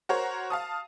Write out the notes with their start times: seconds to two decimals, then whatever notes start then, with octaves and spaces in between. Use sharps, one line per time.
0.09 F#4 A#4 C5 C#5 A#5
0.50 F5 A5 D#6